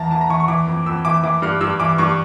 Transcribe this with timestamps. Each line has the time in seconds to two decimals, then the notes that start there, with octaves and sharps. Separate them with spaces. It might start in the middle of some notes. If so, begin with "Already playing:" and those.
Already playing: E2 E3 A5 A#5
0.11 E3 A5
0.21 A#5
0.30 E3 C#6
0.40 C#6
0.48 E3 D6
0.67 F2
0.86 F2 E6
1.05 E3 D6
1.23 E3 D6
1.42 G2 F6
1.61 G2 E6
1.80 E3 D6
1.98 G2 C#6